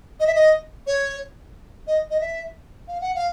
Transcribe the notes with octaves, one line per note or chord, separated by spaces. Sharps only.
D#5
E5
D#5
C#5
D#5
D#5
E5
F5
F#5
F5